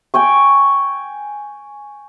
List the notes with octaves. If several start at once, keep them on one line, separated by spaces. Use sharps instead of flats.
G5 G#5 C#6